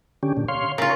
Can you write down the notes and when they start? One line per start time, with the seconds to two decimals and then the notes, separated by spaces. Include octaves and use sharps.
0.23 D3 C#4 G4
0.37 A#2 D3
0.48 C#5 F5 C6
0.78 C#3 F4 A#4 C#5